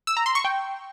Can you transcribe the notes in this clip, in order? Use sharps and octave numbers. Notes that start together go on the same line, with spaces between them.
E6
A#5
C6
C#6
G5